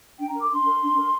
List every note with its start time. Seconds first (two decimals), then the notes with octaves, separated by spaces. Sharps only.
0.18 D4 G5
0.29 A#5
0.34 A#4
0.41 D6
0.50 D4 C6
0.66 A#4
0.82 D4
0.97 A#4